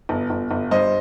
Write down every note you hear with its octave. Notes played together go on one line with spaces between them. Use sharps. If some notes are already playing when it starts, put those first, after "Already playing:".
G1
G1
G1
G2 C5 D#5